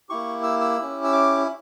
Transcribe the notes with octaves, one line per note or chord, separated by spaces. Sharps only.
A#3 E4 G4 C#6
E6
E6
C#4 E4 G4
E6
D6